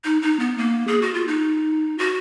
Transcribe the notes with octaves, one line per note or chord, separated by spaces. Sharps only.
D#4
D#4
B3
A#3
G#4
F#4
F4
D#4
F#4